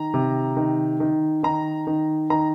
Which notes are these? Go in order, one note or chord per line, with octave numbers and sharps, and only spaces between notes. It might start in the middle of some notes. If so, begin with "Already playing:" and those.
Already playing: D#3 A#5
C3
D#3
D#3
D#3 A#5
D#3
D#3 A#5